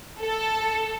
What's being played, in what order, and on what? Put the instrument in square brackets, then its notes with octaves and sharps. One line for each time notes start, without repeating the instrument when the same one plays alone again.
[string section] A4